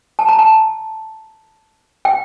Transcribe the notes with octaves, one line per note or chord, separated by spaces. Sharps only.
A5
A#5
A5
G5